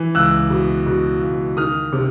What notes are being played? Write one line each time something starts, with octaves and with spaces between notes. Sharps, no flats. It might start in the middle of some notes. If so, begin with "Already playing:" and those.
Already playing: E3
C#2 E6 F#6
B2
B2
C#2
D#3 D#6 F6
C3